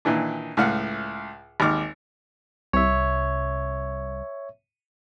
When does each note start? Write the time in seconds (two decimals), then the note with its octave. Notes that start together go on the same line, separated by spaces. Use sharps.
0.05 A#2 D#3 E3 D4
0.57 C#2 A2 F5 F#5
1.60 G#1 D#2 D6 F6
2.73 C2 C#5 E5